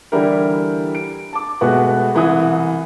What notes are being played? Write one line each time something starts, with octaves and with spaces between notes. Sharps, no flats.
D3 E3 G3 E4 G4 A#4
D7
A5 D6
B2 G#3 A3 B3 F#4
C2 E3 E4 F#5 D#6